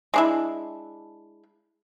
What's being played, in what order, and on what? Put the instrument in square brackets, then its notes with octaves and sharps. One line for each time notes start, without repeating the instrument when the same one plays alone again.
[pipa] G#3 D4 E4